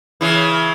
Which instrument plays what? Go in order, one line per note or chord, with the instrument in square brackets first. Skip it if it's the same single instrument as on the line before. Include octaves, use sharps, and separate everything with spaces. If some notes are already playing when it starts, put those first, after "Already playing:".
[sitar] C#3 E3